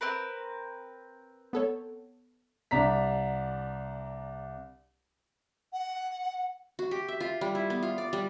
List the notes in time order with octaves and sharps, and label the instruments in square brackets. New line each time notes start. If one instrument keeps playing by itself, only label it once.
[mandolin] C4 A#4 B4
[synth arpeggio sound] B3 A4 C#5
[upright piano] C2 D4 A#5 B6
[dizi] F#5
[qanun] F#4
G4
E5
F4
G3
E4
B3
F4
D5
G3